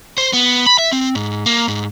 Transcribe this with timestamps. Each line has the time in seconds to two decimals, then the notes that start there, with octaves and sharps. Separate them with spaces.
0.18 C5
0.33 B3
0.66 B5
0.79 E5
0.92 C4
1.15 G#2
1.46 A#3
1.68 G#2